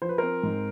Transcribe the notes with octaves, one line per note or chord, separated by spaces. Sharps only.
F3 C5
B4
C4 A#4 C5
G#2